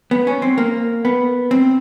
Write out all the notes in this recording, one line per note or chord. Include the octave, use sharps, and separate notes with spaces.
B3
C#4
C4
A#3
B3
C4